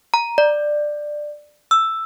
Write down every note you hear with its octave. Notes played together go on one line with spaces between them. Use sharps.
A#5
D5
E6